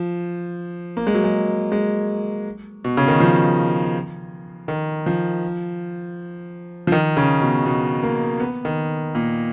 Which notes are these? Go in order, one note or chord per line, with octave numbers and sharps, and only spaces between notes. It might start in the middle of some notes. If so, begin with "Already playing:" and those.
Already playing: F3
A#3
G#3
F#3
G#3
G#3
B2
C#3
D#3
F3
D#3
F3
F3
D#3
C#3
B2
B2
A#3
B3
D#3
A#2